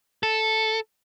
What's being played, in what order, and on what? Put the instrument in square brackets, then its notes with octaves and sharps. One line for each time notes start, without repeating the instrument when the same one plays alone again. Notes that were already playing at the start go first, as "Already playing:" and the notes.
[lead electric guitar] A4